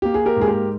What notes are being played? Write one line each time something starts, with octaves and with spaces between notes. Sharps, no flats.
A#3 G4
G#4
G4 A#4
G#2 G#4
G4 A#4